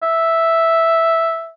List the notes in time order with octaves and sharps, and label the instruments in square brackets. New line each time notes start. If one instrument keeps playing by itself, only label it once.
[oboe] E5